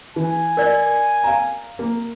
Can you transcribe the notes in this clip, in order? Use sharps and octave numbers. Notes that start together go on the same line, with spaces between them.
E3 G#5
A#4 D5 D#5
F5 A#5
A#3